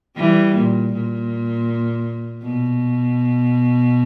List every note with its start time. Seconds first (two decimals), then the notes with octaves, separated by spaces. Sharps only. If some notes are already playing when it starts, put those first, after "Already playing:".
0.17 E3 G3
0.55 A#2
0.93 A#2
2.43 B2